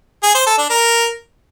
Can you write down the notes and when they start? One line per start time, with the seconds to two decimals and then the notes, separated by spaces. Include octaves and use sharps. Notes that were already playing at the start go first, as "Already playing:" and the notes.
0.23 G#4
0.35 C5
0.46 A4
0.58 D4
0.70 A#4